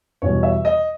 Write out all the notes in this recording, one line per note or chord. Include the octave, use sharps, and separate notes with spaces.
E2 B2 G3 C#5
E5
D#5